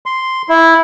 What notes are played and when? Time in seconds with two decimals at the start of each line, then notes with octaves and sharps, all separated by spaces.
0.06 C6
0.49 E4